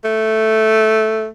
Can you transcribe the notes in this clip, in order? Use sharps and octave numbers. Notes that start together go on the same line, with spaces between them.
A3